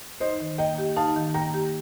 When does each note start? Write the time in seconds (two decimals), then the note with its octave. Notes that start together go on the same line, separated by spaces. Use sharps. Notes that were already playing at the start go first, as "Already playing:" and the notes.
0.20 D#4 C5 D#5
0.40 D#3
0.58 A#3 D#5 G5
0.78 G4
0.96 D#4 F5 A5
1.16 D#3
1.34 A#3 G5 A#5
1.54 G4